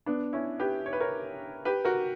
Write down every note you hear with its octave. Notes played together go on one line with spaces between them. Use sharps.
B3 D4
C#4 E4
G4 B4
C#5
B4
A#4 C#5
G4 B4
F#4 A#4